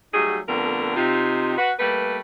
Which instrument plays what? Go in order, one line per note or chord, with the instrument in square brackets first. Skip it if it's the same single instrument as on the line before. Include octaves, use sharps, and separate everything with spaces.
[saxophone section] F#3 G3 A3 D#4 F#4 G#4
F2 D3 G3 A3 B3 A#4
C3 D#4 F4
F#4 B4 F#5
G3 A3 A#3 B4